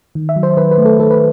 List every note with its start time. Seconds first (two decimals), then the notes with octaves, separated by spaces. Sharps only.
0.15 D#3
0.29 E5
0.36 F#3
0.43 C5
0.57 D#3 B4
0.71 B4
0.78 A3
0.85 A4
0.99 D#3 A4
1.11 B4